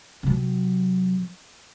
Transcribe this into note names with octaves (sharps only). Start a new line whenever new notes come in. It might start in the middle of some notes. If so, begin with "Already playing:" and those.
C3 F#3